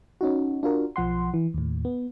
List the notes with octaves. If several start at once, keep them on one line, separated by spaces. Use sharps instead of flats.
C#4 D#4 F#4
D4 F4 F#4 A#4
B1 F3 F#5 C6
E3
D#2 A2
B3